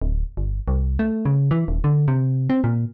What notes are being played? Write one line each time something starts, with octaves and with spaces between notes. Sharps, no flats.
D1
G1
C2
A3
C#3
E3
D#1
D3
C3
C4
A#2